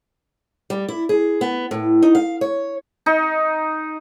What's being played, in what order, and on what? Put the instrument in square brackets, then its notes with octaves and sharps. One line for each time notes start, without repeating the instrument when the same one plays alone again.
[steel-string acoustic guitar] G3
E4
G#4
B3
A2
D#4
F5
C#5
[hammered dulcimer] D#4